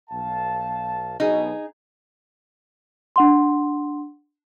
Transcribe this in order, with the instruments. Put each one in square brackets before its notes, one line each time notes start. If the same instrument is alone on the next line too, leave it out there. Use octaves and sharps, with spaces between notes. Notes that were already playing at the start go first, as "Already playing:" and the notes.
[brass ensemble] B1 F5 A5
[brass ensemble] B1 B2 [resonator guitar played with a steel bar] D#4 G#4
[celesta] D4 F#5 C6